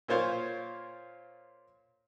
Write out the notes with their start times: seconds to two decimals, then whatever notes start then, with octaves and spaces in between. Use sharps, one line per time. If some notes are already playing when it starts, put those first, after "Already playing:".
0.08 A#2 A#3 F4 C5 C#5 F5